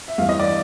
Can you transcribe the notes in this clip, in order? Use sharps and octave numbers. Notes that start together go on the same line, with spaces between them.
E5
G2 E3 F5
D#5
D5